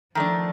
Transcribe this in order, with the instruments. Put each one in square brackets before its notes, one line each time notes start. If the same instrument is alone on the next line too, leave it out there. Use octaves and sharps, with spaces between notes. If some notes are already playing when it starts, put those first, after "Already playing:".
[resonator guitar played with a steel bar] D#3 A3 D4 [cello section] F3